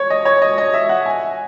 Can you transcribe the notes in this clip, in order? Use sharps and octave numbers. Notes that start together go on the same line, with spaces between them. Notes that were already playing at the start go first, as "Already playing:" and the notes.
Already playing: C#5
D#5
C#5
D#5
D#5
E5
F#5
G#5